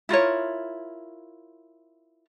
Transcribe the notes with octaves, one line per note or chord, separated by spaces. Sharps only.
E4 F4 A#4 C#5